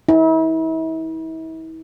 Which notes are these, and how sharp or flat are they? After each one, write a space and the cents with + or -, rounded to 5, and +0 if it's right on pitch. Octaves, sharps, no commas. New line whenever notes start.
E4 -40